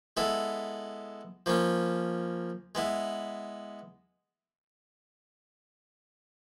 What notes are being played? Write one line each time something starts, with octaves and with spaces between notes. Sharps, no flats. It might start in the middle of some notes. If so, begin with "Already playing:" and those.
G#3 B3 E4 A4
F3 A#3 C#4
G#3 B3 E4